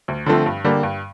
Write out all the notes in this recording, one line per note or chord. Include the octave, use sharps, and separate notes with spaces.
D2
D3 F3 A3 C4
G2
D3 G3 A#3
G2